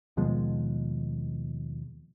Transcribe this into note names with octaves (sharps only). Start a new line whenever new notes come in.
D#2 B2 F3 G#3